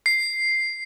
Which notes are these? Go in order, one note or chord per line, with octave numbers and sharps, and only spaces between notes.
C7